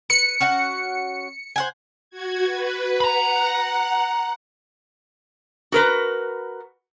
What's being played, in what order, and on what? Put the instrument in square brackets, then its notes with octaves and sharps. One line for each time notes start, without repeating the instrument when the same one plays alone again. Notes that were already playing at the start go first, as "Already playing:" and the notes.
[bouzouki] B4 [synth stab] C#7
[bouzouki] C#4 F#4 F#5
C5 F#5 G#5
[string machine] F#4 G#6
B4
[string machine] F#5 [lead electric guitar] A#5 B5
[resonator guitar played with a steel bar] F#4 A#4 B4